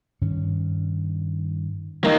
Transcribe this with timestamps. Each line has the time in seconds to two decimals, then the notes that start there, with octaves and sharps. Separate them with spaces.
0.21 G2 D#3 C#4
2.04 A#3 D#4